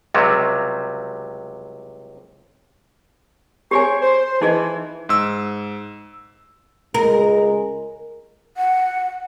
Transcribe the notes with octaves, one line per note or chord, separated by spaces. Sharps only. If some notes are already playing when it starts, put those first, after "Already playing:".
C#2 C3 F#3 G3
G4 G#4 C5 C#5 G#5
C5
E3 D#4 G#4 D#5
G#2 E6
C#2 G#3 A#4
F#5